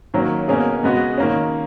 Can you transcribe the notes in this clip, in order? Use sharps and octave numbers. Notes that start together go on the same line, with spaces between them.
D#3 F#3 A#3 C#4
B2 A#3 C#4 G#4
C#3 G#3 B3 F#4
D#3 A#3 C#4